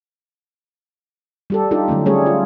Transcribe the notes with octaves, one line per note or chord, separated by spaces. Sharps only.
G3 G4 A4
D4 D#4 F4 G4 A4
D3 F#3 A3 C#4
G3 A3 C#4 G#4 A4 C#5
F4